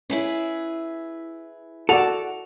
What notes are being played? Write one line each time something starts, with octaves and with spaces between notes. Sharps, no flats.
C#4 E4 G#4 B4
F#4 A4 D5 F#5 F7